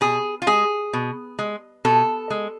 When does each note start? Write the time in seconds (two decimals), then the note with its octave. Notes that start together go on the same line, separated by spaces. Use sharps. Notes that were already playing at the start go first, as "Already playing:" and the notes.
0.01 B2 G#4
0.42 F4
0.47 G#3 G#4
0.93 B2
1.39 G#3
1.85 B2 A4
2.30 G#3